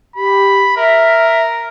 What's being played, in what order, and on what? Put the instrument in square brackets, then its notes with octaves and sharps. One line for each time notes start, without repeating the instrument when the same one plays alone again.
[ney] G4 [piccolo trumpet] B5
[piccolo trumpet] A#4 [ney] E5